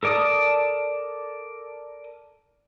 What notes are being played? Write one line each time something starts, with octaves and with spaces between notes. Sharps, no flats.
A4 A#4 D5 A5 D#6